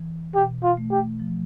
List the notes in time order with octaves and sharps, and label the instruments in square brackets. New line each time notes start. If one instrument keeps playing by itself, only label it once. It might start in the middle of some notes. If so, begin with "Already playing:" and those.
Already playing: [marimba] E3
[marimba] B2 [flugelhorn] G4
[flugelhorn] F4
[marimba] A3
[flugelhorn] G4
[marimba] F3